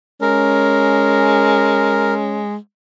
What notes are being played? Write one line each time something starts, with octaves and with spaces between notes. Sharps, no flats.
G#3 C#4 A#4